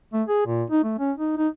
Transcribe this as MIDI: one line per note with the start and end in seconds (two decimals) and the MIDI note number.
0.13 0.23 57
0.28 0.45 68
0.46 0.63 46
0.70 0.84 63
0.84 0.97 57
0.99 1.12 61
1.18 1.34 63
1.38 1.48 63